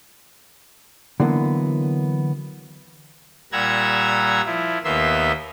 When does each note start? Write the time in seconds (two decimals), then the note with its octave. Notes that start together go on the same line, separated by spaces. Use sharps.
1.20 D3 E3 F#3 A#3 B3
3.52 A#2 G3 F#5 A#5 E6 G#6
4.45 F3 E4
4.84 D#2 A#3 B3 E5 C6 E6